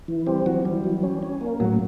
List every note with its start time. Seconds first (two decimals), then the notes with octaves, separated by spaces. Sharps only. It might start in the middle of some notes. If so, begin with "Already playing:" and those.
0.08 E3
0.27 G3 C4 G4
0.46 E3 F#3 F#4
0.65 E3 G3 G4
0.84 F#3
1.03 C#4
1.23 C#4
1.41 A#3
1.60 A2 F#3 F#4